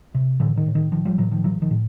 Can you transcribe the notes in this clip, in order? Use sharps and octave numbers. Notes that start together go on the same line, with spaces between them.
C3
A2 D3 E3
D#3
A2
D#3
A1 D#3 F3
F3 G3
A2 E3 F#3
D#3 F3
A#1 E3 F#3
D#3 F3
A2